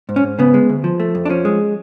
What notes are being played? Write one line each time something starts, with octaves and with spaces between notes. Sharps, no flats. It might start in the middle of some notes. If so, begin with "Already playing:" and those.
G#2
C#4
G#2
C#3 B3
G#3
D2
F3
A3
F2
D4
F3 C#4
G#3